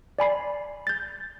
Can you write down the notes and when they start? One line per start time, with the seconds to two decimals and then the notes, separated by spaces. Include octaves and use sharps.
0.19 D5 G#5 B5 C7
0.87 G6 A6